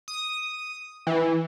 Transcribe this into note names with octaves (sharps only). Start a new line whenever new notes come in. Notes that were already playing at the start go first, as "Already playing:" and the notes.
D#6
E3